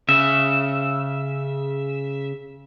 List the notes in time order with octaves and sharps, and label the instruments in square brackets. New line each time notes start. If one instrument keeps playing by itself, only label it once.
[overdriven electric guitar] C#3 [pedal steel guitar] E5